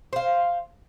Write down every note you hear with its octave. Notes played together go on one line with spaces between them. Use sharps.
C5 F5